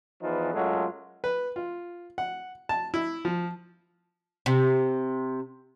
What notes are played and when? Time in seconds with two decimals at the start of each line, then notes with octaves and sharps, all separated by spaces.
0.22 E2 E3 F3 D#4 B4
0.54 F#2 F#3 G#3 A3 F4
1.24 B4
1.56 F4
2.18 F#5
2.69 A5
2.94 E4
3.25 F3
4.46 C3